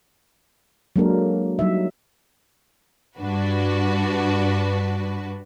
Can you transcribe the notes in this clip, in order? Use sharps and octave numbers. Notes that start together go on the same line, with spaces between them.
F#3 G#3 A#3 D4 A4 A#4
F#3 G3 D#4 E5
G2 D4 F#4 B4